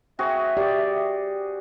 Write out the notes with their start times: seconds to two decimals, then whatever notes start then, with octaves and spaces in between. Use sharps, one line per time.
0.19 C4 F#4 G#4 E5
0.57 G4 D5